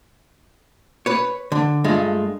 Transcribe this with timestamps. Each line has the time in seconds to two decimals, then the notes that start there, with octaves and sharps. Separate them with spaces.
1.06 B4 C#5
1.52 D3
1.84 G2 G#3 A3 F4